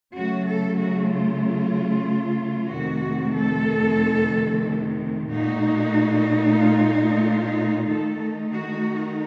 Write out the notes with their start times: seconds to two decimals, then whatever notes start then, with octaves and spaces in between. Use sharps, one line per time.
0.14 C#3 F#3 A3 F#4
0.47 A4
0.78 F#4
1.11 F4
2.72 F2 C3 D#3 A3 F#4
3.36 A4
5.29 A#2 A3 D#4 F#4
6.58 F4
6.91 F4
7.87 D#3 A3 D#4 A4
8.51 F#4